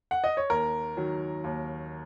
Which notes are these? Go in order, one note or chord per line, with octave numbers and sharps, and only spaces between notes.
F#5
D#5
C#5
D#2 A#4
D#3 F#3
D#2